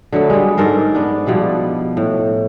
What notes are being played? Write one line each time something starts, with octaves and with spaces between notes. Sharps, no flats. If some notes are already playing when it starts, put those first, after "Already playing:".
D3 F#3 A3 B3
G3 G#3
G#2 A4 A#4 C5
B3 D4
B2 F3 G3 E4
A2